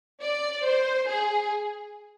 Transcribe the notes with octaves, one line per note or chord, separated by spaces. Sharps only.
D5
C5
G#4